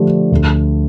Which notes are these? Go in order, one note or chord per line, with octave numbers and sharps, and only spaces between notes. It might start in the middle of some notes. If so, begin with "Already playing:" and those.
Already playing: D3 F3 A3 D4 G4
D2